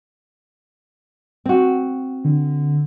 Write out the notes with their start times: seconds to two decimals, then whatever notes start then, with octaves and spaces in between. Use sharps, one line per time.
1.45 C4 F#4
2.24 D3